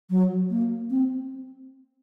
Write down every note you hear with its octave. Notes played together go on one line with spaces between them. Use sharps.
F#3
A#3
C4